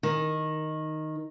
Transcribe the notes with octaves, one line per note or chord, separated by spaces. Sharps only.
D#3